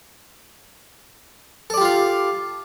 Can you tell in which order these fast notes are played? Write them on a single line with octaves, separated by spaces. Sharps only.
A4 D5 G4 F4 F5